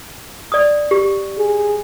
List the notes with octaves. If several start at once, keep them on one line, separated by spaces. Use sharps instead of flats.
D5 D#6
G4
G#4